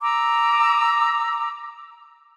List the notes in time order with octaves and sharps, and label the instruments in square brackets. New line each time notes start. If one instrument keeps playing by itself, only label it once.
[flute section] A#5 D6 E6